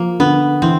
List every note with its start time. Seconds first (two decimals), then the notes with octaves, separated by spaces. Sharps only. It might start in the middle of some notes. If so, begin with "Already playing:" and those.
Already playing: F3 A#3
0.19 D3 B3
0.62 E3 C4